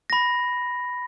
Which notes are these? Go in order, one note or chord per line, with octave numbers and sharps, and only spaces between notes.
B5 A#6